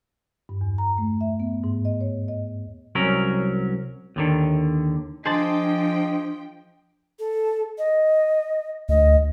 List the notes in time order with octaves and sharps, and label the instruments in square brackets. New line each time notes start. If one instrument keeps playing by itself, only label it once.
[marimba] G2
E2
A#5
A3
E5
B3
G#2
D#5
C#5
D#5
[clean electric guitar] C2 F#3 C#4 A#4
D#2 D3 D#3
[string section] F3 G5 [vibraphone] D4 [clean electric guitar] G#4 C5 A5 [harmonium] D#5
[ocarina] A4
D#5
[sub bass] D2 [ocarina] D#5